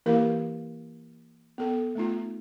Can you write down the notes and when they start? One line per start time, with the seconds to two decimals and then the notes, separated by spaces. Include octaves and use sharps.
0.06 E3 A#3 E4 G4 A#4 F5
1.58 B3 A4
1.95 A3 B3 D#4 F4